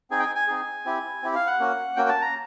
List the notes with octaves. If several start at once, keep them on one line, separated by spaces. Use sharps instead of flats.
C4 D#4 G#4 G#5
G5
G#5
G#5
C4 D#4 G#4
C4 E4 G4
C4 E4 G4
F5
F#5
A#3 C#4 F#4
A#3 C#4 F#4 G5
A5
A#5